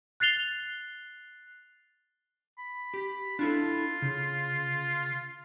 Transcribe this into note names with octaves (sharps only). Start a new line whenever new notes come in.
F#6 A6 C7 F7 G7
B5
G4
D4 E4 F4 A4
C#3